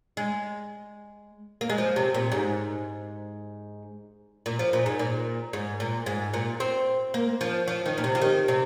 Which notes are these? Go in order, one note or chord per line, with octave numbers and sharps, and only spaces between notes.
G#3
A#3
G#3
F3
C3
A#2
G#2
A#2
F3
A#2
G#2
A#2
G#2
A#2
G#2
A#2
C4
A#3
F3
F3
D#3
A#2
C3
F3
D#3
C3